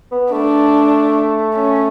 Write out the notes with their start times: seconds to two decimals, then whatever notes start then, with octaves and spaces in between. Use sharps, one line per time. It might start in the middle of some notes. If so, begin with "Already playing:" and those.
0.11 B3
0.32 A3 D4
1.55 C#4